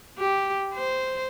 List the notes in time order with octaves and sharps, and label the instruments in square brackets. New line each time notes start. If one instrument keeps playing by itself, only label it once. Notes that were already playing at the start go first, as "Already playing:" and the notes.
[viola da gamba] G4
C5